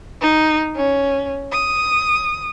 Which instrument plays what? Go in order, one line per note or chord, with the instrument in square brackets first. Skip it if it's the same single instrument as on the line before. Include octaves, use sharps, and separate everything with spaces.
[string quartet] D#4
C#4
D#6